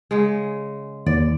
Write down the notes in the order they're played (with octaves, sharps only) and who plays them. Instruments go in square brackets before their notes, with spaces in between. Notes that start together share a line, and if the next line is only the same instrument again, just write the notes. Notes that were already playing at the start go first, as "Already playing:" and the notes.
[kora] C#3 G#3
[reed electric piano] D#2 [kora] D5